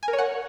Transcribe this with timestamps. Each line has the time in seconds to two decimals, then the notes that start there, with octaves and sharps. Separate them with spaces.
0.03 G#5
0.08 A#4
0.13 C#5
0.18 F#5